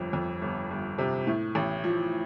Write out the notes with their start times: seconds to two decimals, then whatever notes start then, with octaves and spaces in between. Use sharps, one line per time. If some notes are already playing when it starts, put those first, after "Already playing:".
Already playing: G1 F2
0.13 F2
0.42 G1
0.70 G1
0.98 C3
1.27 A2
1.55 A1
1.84 F3